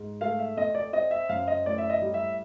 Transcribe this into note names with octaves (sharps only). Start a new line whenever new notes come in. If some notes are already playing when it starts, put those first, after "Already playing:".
Already playing: G#2
A3 F5
E5
F2 D#5
D5
C4 D#5
E5
F#2 F5
D#5
A2 D5
E5
D#5
G3
E5